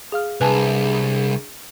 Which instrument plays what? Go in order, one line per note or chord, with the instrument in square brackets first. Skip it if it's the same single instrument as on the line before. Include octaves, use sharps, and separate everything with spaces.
[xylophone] G#4 F5 F6
[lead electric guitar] C2 [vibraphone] D4 G#4 [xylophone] B4 G#5 A5